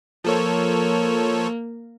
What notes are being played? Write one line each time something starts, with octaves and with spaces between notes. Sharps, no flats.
F3 A#3 A4 C#5